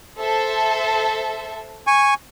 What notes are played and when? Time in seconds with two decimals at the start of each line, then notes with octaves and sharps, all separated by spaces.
0.19 A4 C5 E5
1.87 G#5 C#6